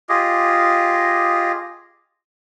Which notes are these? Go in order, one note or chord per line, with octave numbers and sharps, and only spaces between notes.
F4 G4 G#4 D#5